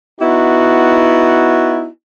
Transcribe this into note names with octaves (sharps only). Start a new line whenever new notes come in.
B3 D#4 E4 F#4